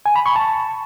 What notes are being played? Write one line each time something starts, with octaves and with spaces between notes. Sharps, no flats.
G#5
B5
C#6
A5